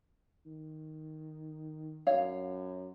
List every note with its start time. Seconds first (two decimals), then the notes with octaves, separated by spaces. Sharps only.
0.46 D#3
2.07 F#2 C#5 F5